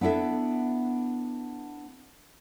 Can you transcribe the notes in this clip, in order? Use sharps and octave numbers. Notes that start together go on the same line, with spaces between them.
B3 D4 E4 A4 E5